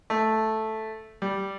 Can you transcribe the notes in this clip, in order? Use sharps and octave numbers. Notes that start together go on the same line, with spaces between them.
A3
G3